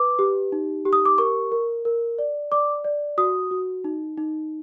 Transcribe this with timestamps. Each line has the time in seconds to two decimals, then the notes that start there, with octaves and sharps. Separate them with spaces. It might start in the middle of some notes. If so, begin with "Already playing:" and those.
Already playing: B4 D6
0.19 G4
0.52 D#4
0.85 G4
0.93 D#6
1.05 D6
1.18 A#4 C#6
1.52 A#4
1.85 A#4
2.19 D5
2.52 D5 D6
2.84 D5
3.18 F#4 D#6
3.51 F#4
3.84 D#4
4.18 D#4